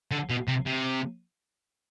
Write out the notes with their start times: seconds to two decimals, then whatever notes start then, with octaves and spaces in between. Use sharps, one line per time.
0.11 D3
0.30 B2
0.48 C3
0.66 C3